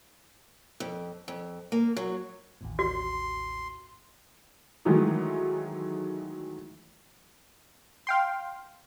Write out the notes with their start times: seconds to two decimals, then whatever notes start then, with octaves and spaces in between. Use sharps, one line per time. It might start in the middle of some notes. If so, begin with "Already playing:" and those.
0.80 F2
1.28 F2
1.72 A#3
1.97 F#3
2.61 A1 D#2 A2
2.79 F#4 C6
4.85 D#3 E3 F#3 G#3 A3 D#4
8.07 F5 G5 C6